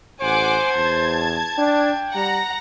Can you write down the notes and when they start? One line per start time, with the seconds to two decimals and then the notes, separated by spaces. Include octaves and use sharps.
0.21 A1 C5 F#5 G#5 D6
0.76 E2 A5 G#6
1.58 D4 G5
2.15 G3 F#5 A#5